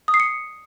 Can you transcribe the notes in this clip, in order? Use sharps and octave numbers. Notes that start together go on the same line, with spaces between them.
D#6
C7
C#7